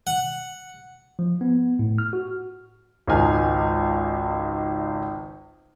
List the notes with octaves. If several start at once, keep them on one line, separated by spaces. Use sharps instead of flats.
F#5
F3
B3
A2
F6
F#4
G#1 C#2 D#3 D#4 G#5 F6